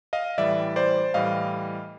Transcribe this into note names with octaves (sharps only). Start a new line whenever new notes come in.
D#5 F5
A2 E3 G3 D5 E5
C5 D5
A2 E3 G3 D#5 F5